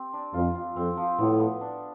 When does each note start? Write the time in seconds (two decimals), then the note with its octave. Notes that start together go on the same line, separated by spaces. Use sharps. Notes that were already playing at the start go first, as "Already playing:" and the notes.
Already playing: C4 G4
0.13 D4
0.34 F2 F4
0.55 F4
0.76 F2 C4
0.97 F3
1.18 A2 B3
1.40 B3
1.61 D4